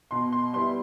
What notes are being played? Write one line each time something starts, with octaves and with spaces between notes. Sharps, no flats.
B2 C6
C6
G3 B3 E4 C6